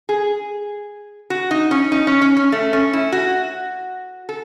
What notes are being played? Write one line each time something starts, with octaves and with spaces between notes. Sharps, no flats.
G#4
F#4
D#4
C#4
D#4
C#4
C#4
C#4
A3
C#4
E4
F#4
A4